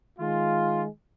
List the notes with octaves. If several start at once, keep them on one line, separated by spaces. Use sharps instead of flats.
D#3 G#3 F4